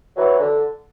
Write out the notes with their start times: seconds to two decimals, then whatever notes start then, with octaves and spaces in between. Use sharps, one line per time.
0.17 E3 F#3
0.40 D3